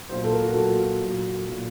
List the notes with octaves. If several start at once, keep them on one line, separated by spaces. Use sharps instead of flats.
A#2 F#3 C5
A4
A#4
F#4
A#2 F#3 A4
F#4
A#2 F#3
A#2 F#3